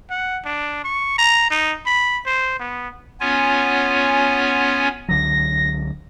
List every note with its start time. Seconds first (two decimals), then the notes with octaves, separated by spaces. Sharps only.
0.10 F#5
0.45 D4
0.85 C#6
1.18 A#5
1.51 D#4
1.86 B5
2.26 C5
2.60 B3
3.20 B3 C#4 F4 C#5 G#5
5.08 C#2 D3 F#3 A#6